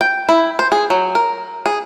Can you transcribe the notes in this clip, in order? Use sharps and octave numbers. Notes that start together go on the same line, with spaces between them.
G5
E4
C5
G#4
F#3
A#4
G#4